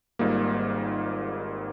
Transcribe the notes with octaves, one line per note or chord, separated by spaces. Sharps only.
G#1 G#2 G3 A#3 F4